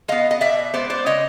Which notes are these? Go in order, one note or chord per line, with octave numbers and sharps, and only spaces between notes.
G#3 B3 D#5 F5
D#5
B2 D5 E5
G#3 B3 C5 D5
C5 D5
C#3 C#5 D#5